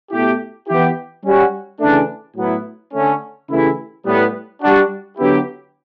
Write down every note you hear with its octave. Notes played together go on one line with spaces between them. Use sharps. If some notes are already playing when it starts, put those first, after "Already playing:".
B2 A3 E4 G4
E3 B3 E4 G4
G3 C#4 F#4
C#3 E3 A3 D4
A2 F#3 B3 E4
D3 A3 C#4
C#3 E3 A3 E4 G4
A2 G3 B3
G3 D4 F#4
D3 F#3 B3 E4 G4